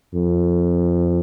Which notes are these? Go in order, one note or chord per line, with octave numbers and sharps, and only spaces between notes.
F2